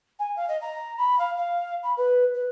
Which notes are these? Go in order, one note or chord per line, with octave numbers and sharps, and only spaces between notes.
G#5
F5
D#5
A#5
B5
F5
F5
B5
B4
B4